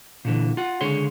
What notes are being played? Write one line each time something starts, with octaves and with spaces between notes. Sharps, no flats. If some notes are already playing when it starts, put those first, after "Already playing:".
A#2 D3 E3
F4 F#5
C#2 D3 G#4 C#5 C6